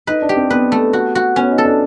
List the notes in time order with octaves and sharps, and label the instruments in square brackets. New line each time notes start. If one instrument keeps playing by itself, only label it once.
[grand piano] D#4 [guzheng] B4
[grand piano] D4
[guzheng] G4
[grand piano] C4
[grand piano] B3 [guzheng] B4
[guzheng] A3
F#4
F#4
[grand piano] B3 [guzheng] C#4
[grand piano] D#4
[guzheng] A4
[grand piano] D4